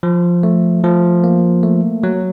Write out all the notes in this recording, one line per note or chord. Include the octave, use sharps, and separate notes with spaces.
F3
A3
F3
A#3
A3
F#3